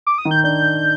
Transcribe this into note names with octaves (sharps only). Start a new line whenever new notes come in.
D6
D#6
D#3
G6
D4 G6